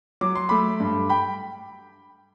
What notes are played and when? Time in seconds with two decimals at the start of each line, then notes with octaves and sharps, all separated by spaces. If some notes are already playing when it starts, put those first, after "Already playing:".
0.21 F#3 D6
0.35 C6
0.49 A3 B5 D6
0.80 G2
1.09 G5 B5